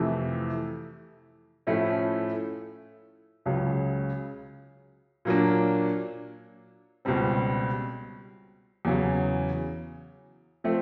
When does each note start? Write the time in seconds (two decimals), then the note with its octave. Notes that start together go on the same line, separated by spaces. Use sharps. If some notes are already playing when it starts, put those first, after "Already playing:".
Already playing: F2 C3 E3 A3
1.67 A2 F3 A3 C#4 E4
3.46 C#2 C#3 F#3
5.25 A#2 F#3 A#3 D4
7.05 C#2 B2 G3 C4
8.85 E2 C#3 F#3
10.64 F3 A3 C4